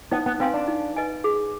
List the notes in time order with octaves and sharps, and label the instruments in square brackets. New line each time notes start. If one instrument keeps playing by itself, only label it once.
[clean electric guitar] B3 [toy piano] D#4
[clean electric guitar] B3
[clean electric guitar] C4 [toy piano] B4 F5 G#5 C6
[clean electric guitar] D4
[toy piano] D#4
B4 D#5 G#5
G#4